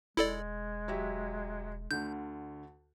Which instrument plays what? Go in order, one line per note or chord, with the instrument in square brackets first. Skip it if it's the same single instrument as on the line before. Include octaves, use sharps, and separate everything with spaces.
[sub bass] E1 [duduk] G#3 [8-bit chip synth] E4 A4 D5
[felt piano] F#3 G4 E5
[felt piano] D2 D3 [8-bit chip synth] G6